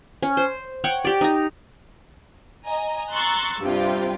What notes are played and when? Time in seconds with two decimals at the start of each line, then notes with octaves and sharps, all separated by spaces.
0.23 C#4
0.37 C5
0.84 C#5 F#5 G5
1.05 G4 D5
1.21 D#4 A#5
2.66 D#5 G#5 A#5
3.12 A#5 C6 C#6 E6 F#6 A6
3.61 G2 C3 F4 G4 G5